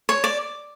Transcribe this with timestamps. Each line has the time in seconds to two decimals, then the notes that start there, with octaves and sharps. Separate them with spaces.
0.09 C#5
0.24 D5